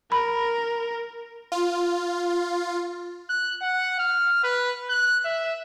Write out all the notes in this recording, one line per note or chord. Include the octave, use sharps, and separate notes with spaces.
A#4 B5
F4
F#6
F#5
F6
B4
F#6
E5